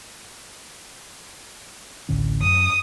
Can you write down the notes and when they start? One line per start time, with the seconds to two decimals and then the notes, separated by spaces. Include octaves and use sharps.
2.09 A1 D2 C#4
2.42 F#2 D#6